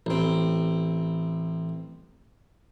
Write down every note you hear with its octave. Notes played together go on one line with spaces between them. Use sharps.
A1 C4